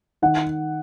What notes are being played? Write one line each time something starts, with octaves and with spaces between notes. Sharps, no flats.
D#3 F#5